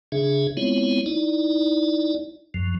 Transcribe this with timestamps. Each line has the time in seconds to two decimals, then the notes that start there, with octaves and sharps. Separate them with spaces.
0.12 C#3 D4 G#4 E5
0.57 G#3 B3 C4 E4 F4 C#5
1.06 D#4 E4 D5
2.54 F#2 F3